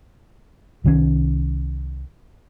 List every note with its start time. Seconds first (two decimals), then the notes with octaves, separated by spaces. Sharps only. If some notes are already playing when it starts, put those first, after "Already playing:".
0.84 C2 D#3 E3 C#4